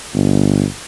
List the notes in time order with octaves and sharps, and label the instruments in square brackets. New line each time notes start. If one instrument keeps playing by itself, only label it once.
[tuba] G1